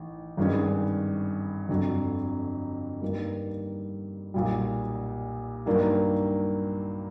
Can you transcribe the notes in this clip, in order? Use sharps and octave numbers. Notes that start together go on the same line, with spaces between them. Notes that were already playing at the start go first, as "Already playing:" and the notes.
Already playing: A1 D#3
G#1 G2 D#3 G#3 C#4
G1 F2 D3 F#3
G2 D#3 G3 A#3
B1 A#2 G3
G2 D#3 F#3 A#3 D4